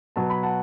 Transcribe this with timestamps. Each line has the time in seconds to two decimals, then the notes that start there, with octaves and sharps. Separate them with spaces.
0.16 B2 F#3 B3 A5
0.30 B5
0.43 F#5 A5